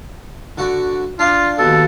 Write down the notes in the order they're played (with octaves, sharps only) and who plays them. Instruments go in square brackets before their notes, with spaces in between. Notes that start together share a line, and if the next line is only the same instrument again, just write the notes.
[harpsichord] D3 F#4 F#5
[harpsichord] D4 F5 [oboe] F4
[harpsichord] D#2 B2 [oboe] A4